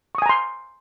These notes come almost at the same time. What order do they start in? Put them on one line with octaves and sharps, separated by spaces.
C#6 D#6 G#5 A#5 C6